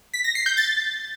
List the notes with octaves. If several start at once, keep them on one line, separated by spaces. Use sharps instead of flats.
B6
A#6
C7
G6
A6